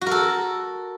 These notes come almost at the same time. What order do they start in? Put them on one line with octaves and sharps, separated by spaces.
F#4 A#4 A4